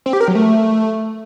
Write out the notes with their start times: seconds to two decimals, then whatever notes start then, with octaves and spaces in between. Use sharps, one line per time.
0.06 C4
0.13 G4
0.20 A#4
0.28 F#3
0.35 A3